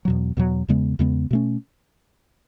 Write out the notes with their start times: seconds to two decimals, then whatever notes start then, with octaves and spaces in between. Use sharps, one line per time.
0.05 E2 B2 F#3
0.37 E2 B2 F#3
0.68 E2 C#3 G#3 B3
0.99 E2 C#3 G#3 B3
1.31 B2 A3 C#4